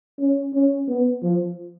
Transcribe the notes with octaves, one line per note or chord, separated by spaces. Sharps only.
C#4
C#4
B3
F3